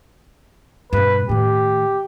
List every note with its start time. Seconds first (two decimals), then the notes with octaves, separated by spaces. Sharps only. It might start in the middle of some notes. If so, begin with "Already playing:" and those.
0.93 G2 B2 B4
1.29 A2 D#3 G4